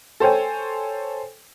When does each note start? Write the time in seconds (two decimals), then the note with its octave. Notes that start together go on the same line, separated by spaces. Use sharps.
0.20 A4 C5 C#5 G5 G#5